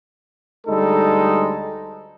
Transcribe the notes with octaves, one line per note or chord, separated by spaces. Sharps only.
D2 G3 G#3 D#4 A4